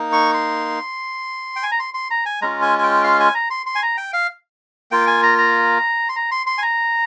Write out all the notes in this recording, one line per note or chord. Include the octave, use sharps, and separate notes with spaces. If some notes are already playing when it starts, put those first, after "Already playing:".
Already playing: A#3 D#4
C#6
C6
G5
G#5
A#5
C6
C6
A#5
G#5
G#3 C#4 F4 A#5
G#5
G#5
G5
F5
G#5
A#5
C6
C6
G#5
A#5
G5
F5
A#3 F4 G5
G#5
A#5
A#5
C6
A#5
C6
C6
G#5
A#5